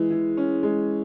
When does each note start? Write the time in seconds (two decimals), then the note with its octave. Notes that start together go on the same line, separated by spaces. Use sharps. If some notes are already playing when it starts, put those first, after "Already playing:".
Already playing: E3 G#3
0.10 E3
0.37 C#4
0.63 G#3